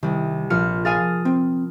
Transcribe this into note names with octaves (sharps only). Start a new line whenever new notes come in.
C2 D#3 G3
A#1 F4 F6 C#7
G#4 F5 G#5 D#6 F6 A6
C4